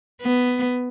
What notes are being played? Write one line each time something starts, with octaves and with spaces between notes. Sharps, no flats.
B3